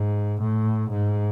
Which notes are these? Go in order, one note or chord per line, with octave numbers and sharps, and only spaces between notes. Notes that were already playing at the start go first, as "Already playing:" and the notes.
Already playing: G#2
A2
G#2